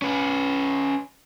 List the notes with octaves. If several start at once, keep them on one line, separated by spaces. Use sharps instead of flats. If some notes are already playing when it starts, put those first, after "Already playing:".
C#4 B4